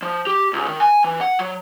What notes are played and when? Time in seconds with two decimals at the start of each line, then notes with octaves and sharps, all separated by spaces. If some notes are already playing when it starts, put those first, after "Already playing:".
0.02 F3
0.27 G4
0.53 C#2
0.68 D#3
0.80 G#5
1.04 E3
1.21 F#5
1.39 F#3